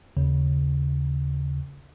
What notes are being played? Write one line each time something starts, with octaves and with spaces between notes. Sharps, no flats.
D#2 C#3